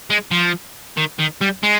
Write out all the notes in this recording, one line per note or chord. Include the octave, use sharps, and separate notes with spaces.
G#3
F3
D#3
D#3
G3
G#3